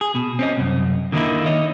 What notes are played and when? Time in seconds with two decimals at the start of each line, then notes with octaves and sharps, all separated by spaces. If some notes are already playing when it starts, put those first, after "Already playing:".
0.01 G#4
0.15 B2
0.39 C4 C#4 D#5
0.57 C2 F#2
1.12 D3 D#3 A#3 D#4 E4
1.46 C#5 D#5